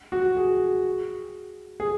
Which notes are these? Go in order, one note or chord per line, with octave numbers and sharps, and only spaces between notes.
F#4
G#4
G#4